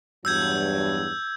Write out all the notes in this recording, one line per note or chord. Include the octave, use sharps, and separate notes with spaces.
E2 G2 F#3 E6 G6 G#6